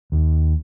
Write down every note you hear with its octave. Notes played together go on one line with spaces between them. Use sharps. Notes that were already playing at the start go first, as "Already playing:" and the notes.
D#2